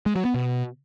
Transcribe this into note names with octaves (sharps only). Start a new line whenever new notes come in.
G#3
F#3
B3
B2